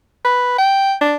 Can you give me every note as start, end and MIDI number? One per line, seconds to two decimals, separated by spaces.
0.25 0.56 71
0.58 0.94 79
1.01 1.16 62